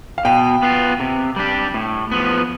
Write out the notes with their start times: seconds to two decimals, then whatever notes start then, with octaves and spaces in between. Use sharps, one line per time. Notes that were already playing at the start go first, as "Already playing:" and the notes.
0.18 F5
0.25 B2 G5
0.63 B3 F4
1.00 C3
1.36 G3 D4 G4
1.74 A2
2.11 F3 B3